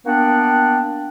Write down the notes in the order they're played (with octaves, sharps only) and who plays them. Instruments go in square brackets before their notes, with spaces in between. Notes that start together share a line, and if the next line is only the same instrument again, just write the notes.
[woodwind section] A#3 B3 D4 F#5 G5